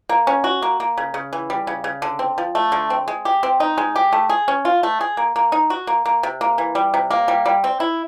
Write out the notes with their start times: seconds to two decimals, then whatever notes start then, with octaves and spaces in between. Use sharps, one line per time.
0.09 A#3
0.27 C#4
0.44 F#4
0.62 A#3
0.80 A#3
0.98 C#3
1.14 C#3
1.33 E3
1.50 G3
1.67 C#3
1.84 C#3
2.02 D3
2.19 C4
2.38 F3
2.55 A3
2.72 D3
2.90 C4
3.08 G#3
3.25 G4
3.43 C4
3.60 D#4
3.78 G#3
3.96 G4
4.13 A3
4.30 G#4
4.48 C#4
4.65 F4
4.83 A3
5.01 G#4
5.17 A#3
5.36 A#3
5.52 D#4
5.70 F#4
5.87 A#3
6.06 A#3
6.23 C3
6.41 A#3
6.58 E3
6.75 G3
6.94 C3
7.11 A#3
7.28 G3
7.46 G3
7.64 C4
7.80 E4